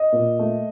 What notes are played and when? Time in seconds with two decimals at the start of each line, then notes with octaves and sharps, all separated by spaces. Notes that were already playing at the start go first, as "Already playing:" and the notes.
Already playing: D#5
0.13 A#2
0.39 A3